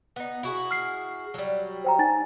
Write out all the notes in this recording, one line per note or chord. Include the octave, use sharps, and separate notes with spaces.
B3 D#4
E4 F#4 G#4
F6 C7
F#3 G3
C5 G5 A#5
D#4 G#5 A6